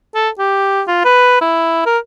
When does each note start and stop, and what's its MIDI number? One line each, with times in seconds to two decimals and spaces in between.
0.15 0.29 69
0.39 0.83 67
0.88 1.02 65
1.05 1.40 71
1.41 1.86 64
1.86 1.98 70